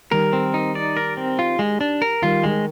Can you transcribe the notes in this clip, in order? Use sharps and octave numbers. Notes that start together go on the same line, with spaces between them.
D#3 G3 A#4
C4
D#4
D5
A#4
C4
F4
G#3
D4
A#4
D#3 G3 F4
D#3 G#3